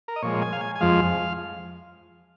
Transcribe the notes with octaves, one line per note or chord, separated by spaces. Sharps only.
A#4
D#5
A#2 F3 G#3 C#5
G#5
F5
G#5
G#5
F2 F3 G#3 F5